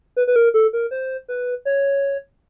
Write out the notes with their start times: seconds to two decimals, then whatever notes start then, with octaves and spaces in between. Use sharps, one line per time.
0.17 B4
0.27 B4
0.36 A#4
0.54 A4
0.73 A#4
0.91 C5
1.28 B4
1.65 C#5